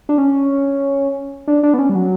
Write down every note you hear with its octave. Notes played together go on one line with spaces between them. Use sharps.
D4
C#4
D4
D4
B3
C#4
G3
F#3